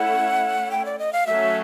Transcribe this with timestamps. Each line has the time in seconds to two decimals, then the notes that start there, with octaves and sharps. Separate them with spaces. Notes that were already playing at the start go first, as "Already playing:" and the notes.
Already playing: A3 C#4 E4 F#5
0.71 G5
0.85 D5
0.99 D#5
1.13 F5
1.26 F#3 A3 C#4 F#4 A4 E5